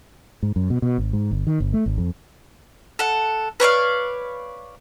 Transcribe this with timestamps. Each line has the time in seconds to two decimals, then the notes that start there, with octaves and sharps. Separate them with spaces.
0.43 G#2
0.56 F#2
0.70 B2
0.82 B2
0.98 G#1
1.13 G#2
1.31 G1
1.47 D#3
1.60 G1
1.74 A3
1.86 G#1
1.98 F2
2.99 A4 F#5
3.60 B4 C#5 D5 F5